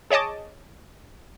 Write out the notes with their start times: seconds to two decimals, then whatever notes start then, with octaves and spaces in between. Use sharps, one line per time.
0.10 G#4 C#5 D#5 A5 D6